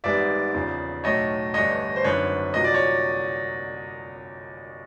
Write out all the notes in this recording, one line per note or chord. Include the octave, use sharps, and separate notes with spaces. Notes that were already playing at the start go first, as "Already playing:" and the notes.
G#1 G#2 E3 G3 B3 D5 E5
E2 C#3 F3
B1 A2 F#3 A3 C#5 D#5
G1 G2 E3 A3 C#5 D#5
C5
G#1 F#2 D3 F#3 B4 C#5
C2 A#2 F#3 D#5
D5
C#5